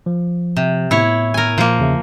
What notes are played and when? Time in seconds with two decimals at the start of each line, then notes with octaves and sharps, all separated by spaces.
0.06 F3
0.56 C3
0.91 A2 B3 E4 C#5
1.34 A#4 G#5
1.58 A#2 F3 A#3
1.79 E2 C#3 E5